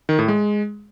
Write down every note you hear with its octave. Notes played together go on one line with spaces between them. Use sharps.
D#3
A2
G#3